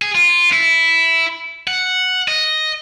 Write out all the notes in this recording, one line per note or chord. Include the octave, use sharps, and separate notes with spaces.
G#4
F4
E4
F#5
D#5